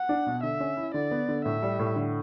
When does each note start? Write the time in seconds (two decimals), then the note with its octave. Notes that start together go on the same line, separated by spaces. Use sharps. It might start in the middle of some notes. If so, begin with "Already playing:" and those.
Already playing: F#5
0.09 D4
0.26 B2
0.43 D3 E5
0.60 C#4
0.77 E4
0.94 D3 D5
1.11 B3
1.29 D3
1.45 A2 E5
1.63 G3
1.79 A2
1.96 D3